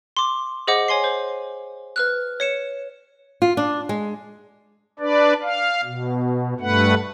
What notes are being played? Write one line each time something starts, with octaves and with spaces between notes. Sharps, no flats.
C6 D6
G#4 C5 D#5 F#5 D6
C#5 G#5 C6 C7
C5
B4 F6 F#6
C#5 C#7 E7
F4
D4
G#3
D4 B4 D5
F5
B2
G2 A3 B4 F#5